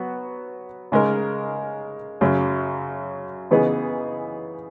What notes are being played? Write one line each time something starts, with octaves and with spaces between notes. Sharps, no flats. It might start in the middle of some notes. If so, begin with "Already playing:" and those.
Already playing: F#3 B3 F#4
C#3 G#3 D#4 A#4
F#2 C#3 F#3
C#3 E3 B3 D#4 G#4